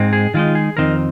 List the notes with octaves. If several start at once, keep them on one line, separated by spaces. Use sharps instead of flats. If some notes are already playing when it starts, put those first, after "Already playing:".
Already playing: G#2 G#3 C4
G#4
D#3 G#3 D#4 F4
G#4
F2 D#3 C4 D#4 A#4